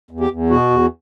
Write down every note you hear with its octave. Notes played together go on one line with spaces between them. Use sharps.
E2
G4
E2
B2 F#4
E2